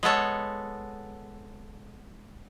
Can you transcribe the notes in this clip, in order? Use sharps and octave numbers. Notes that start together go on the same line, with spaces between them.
G#3 B3 A4 C#5